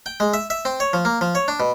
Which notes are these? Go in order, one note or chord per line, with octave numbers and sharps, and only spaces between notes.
G5
G#3
E5
E5
C4
C#5
F3
A#3
F3
C#5
D4
B2